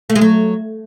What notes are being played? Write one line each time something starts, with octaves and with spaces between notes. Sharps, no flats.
A3
G#3
F#3